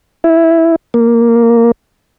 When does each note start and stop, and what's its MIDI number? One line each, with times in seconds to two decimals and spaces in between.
0.24 0.76 64
0.94 1.72 58